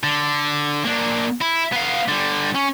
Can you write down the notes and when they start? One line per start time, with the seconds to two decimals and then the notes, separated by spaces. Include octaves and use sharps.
0.03 D3
0.85 A#3 D4
1.41 E4
1.73 B3 F5
2.09 D3 G3
2.55 C#4